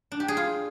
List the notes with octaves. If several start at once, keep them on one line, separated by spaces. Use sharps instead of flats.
D4
G4
G#4
F4